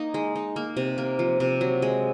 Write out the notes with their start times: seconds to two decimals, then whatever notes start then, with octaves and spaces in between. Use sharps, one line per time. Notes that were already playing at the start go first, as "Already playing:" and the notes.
Already playing: A#3 D#4
0.14 G#3
0.36 D#4
0.56 A#3
0.77 C3
0.98 A#3
1.19 F3
1.40 C3
1.61 F#3
1.82 G#3